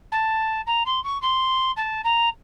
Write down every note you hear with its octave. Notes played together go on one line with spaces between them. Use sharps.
A5
A#5
C6
C#6
C6
A5
A#5